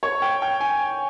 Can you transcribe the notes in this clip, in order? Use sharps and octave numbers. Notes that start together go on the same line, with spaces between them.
C#5
G5
G5
G#5